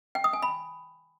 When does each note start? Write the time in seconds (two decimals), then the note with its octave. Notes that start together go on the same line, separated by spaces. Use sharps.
0.15 G5
0.24 D#6
0.33 G#5
0.42 B5